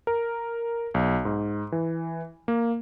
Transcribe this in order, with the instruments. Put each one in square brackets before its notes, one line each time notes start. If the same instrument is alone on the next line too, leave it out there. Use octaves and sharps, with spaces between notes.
[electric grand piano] A#4
B1
G#2
E3
A#3